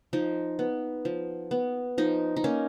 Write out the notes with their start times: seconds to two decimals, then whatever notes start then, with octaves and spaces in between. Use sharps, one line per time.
0.13 F3 D#4
0.59 B3
1.05 F3
1.51 B3
1.98 F3 D#4
2.36 D#4
2.44 A#3 C#4